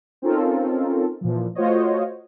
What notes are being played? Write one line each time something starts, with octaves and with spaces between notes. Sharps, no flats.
C4 C#4 D#4 F4 A4 A#4
A#2 E3 F3
A3 F4 F#4 C5 C#5 D#5